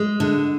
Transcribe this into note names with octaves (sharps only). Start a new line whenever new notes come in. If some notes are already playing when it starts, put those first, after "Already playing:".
Already playing: G#3
D3